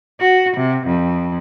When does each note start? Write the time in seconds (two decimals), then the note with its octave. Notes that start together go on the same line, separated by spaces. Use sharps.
0.20 F#4
0.57 C3
0.86 F2